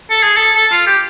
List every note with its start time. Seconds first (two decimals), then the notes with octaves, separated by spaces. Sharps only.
0.10 A4
0.23 G#4
0.37 A4
0.56 A4
0.72 F4
0.87 G4